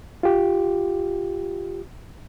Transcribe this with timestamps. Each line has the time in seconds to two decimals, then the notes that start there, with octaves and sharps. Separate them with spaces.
0.23 F4 G4